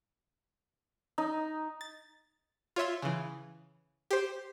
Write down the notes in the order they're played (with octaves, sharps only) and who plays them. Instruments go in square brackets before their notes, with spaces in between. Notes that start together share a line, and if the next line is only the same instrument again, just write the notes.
[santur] D#4
[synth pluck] A6
F4 C#5 E5 C6
C#3 E3
G4 C5